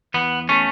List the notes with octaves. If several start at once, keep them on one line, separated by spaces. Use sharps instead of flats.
E2 B3
A3 C#4